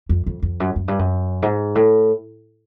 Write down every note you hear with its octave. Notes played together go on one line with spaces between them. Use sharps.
F2
F2
F2
F#2
F#2
G2
F#2
G#2
A2